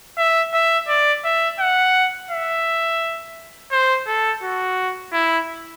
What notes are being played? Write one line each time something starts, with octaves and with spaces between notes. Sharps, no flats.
E5
E5
D5
E5
F#5
E5
C5
A4
F#4
E4